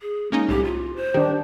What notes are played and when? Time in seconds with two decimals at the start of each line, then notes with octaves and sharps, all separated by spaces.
0.02 G#4
0.32 G#3 A#3 C#4 D#4
0.48 C2 A2 G4
0.64 F4
0.96 C5
1.14 D#3 D4 G4